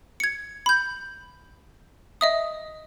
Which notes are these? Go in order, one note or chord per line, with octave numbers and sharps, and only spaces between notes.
G#6 C#7
B5 G6
D#5 E5 D#6